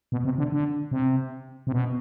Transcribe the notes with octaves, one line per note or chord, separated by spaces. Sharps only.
B2
C3
D3
D3
C3
C3
B2